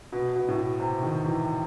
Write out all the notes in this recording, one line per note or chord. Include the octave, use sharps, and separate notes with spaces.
B2
B2
A2
B2
C3
D#3
E3